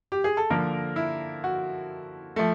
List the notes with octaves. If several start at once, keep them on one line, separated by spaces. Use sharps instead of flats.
G4
G#4
A4
D3 F3 A#3 A#4
E4
F#4
F3 A3